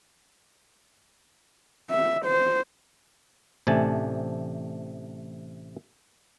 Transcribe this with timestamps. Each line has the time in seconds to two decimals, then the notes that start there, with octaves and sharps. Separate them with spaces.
1.91 E5
2.25 C5
3.67 A1 C3 A3 D4 G#5 A5